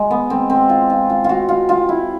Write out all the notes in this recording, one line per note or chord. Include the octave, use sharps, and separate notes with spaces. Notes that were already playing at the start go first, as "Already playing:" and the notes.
Already playing: G#3
B3
C4
C4
F4
F4
F4
F4
F#4
F4
F4
E4